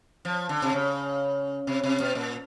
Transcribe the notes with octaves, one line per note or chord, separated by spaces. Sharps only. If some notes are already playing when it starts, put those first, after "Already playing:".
F3
D3
C3
C#3
C3
C3
B2
A#2